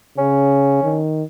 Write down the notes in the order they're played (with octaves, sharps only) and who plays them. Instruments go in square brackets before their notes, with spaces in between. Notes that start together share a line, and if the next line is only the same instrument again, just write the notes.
[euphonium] C#3 [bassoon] C#4
[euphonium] D#3